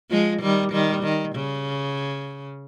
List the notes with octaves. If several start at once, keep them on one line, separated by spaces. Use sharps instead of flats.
F3 G#3
D#3 G3
D#3 G3
D#3
C#3